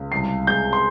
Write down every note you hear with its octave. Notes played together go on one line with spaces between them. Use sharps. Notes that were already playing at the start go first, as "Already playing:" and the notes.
Already playing: C#2
C2 C7
G#3 G6
C6